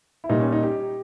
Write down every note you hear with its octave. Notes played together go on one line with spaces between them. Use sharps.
E4
A#2 G3 D#4
C#4
D#4
G4